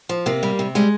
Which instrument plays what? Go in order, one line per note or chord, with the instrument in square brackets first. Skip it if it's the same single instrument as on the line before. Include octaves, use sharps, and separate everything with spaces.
[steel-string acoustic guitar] F3
C3 A#3
G3
C3
G3 G#3